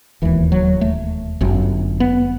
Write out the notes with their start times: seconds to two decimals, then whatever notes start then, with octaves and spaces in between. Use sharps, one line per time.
0.22 E1 D#2 E3
0.52 F#3
0.81 A3
1.41 G1 F#2
2.00 B3